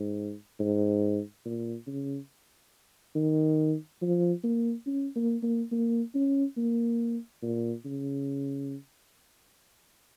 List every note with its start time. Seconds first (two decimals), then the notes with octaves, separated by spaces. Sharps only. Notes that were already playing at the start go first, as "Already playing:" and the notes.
Already playing: G#2
0.60 G#2
1.45 A#2
1.87 C#3
3.15 D#3
4.02 F3
4.43 A#3
4.87 C#4
5.16 A#3
5.43 A#3
5.72 A#3
6.15 C#4
6.57 A#3
7.43 A#2
7.85 C#3